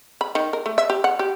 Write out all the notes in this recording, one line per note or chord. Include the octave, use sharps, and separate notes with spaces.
B5
D#3
A#4
A3
E5
G4
F#5
G4